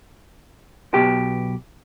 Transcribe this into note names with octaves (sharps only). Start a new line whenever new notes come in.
B1 B2 G4